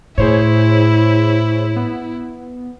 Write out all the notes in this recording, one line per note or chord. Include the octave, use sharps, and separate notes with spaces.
A2 E4 G#4 C5 C#5
B3